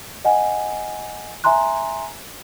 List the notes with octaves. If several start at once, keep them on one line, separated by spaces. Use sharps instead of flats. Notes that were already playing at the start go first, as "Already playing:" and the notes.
D#5 F#5 G#5
E5 G#5 A#5 C6 F#6